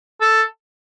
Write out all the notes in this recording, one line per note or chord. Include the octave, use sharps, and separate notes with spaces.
A4